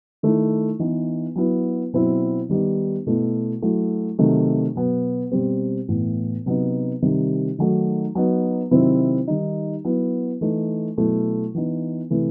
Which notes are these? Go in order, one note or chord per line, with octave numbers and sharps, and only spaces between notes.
D#3 A3 E4
E3 B3 D#4
F#3 B3 E4
B2 F#3 C4 E4
D#3 G3 B3 D#4
B2 A3 E4
F#3 A3 E4
C3 D#3 F#3 A3
B2 F#3 B3
B2 G3 C4
A2 E3 B3
C3 F#3 B3 D#4
C3 D#3 G3
D#3 F#3 A3 D#4
F#3 B3 D#4
C3 D#3 F#3 C4 E4
D#3 G3 D#4
F#3 B3 E4
E3 A3 D#4
B2 F#3 A3 E4
E3 B3 D#4
C3 E3 A3 E4